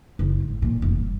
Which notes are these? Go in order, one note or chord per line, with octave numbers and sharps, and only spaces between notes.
F#1
G#2
A#2
F1
G2